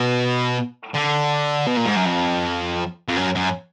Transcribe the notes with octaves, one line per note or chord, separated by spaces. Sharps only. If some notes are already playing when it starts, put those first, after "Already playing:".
Already playing: B2
D3
B2
A#2
G#2
F#2
F2
F2
F#2
F#2